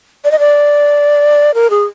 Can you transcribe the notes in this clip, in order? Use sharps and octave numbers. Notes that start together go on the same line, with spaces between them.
D5
D#5
D5
A#4
G#4